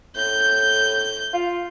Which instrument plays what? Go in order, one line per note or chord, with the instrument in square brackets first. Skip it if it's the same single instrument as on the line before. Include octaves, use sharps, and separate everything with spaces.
[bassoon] A2 [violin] G6
[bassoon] F4